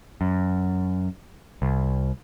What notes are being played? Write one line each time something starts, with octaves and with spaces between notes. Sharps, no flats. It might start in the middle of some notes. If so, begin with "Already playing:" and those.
F#2
C2